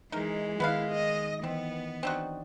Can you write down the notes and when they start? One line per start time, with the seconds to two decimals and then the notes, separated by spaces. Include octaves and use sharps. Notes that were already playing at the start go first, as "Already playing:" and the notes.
0.12 E3 G#3 D#4 A#4
0.60 D#3 B3 E4 B4 F5
0.92 D#5
1.44 E3 B3 C4 D#5
2.03 C4 D4 D#4 F#4 D5